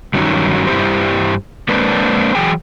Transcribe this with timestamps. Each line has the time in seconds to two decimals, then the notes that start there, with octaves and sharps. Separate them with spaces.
0.14 G2 D#3 F#3 C#4 D#4 F#4
0.67 G2 E4 G4 C5
1.69 G#3 A#3 C4 D4 B4
2.35 E3 F#3 G#4 G5 G#5